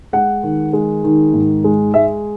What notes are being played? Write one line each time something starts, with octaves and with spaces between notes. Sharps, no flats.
G#3 F#5
D#3
G#3
D#3
G#2
G#3
G#3 E5